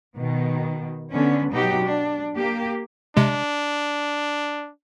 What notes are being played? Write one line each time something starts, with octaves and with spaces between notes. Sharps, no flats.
B2 D#3
D3 B3 C#4
B2 F#3 D#4 F#4 G4
D4
A#3 G4
C3 G#3 D4